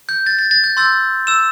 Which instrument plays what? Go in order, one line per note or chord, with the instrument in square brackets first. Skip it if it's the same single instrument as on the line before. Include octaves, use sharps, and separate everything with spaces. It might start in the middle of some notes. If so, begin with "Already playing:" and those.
[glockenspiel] G6
A6
A6
A6
G6
C6 E6 G6 A6
E6 E7